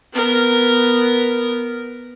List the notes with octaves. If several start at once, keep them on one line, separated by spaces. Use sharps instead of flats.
B3 A#4